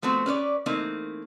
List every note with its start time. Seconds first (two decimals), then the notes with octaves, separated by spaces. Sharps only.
0.02 F3 A3 B3 C4 F#4
0.26 C#4 B4 C#5 D5
0.66 E3 A3 A#3 C4 D#4